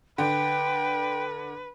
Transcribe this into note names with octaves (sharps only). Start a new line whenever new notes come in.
D3 B4 G5